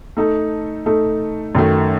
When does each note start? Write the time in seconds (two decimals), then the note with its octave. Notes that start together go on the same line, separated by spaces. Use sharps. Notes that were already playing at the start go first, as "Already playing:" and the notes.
0.17 A3 D#4 A4
0.86 A3 D#4 A4
1.55 F#2 D#3 A3